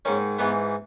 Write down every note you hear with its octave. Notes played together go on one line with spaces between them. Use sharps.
G#2 D#3 C#4
G#2 E3 B3